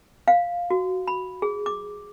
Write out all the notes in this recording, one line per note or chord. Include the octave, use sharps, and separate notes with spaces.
F5
F#4
B5
G#4
D6